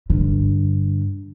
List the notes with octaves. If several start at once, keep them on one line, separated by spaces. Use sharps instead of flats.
G2 D3